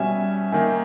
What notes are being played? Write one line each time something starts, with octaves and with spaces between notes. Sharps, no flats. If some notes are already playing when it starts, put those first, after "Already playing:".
Already playing: B2 G3 C#4 E5 G#5
D#3 A#3 D#4 E5 G#5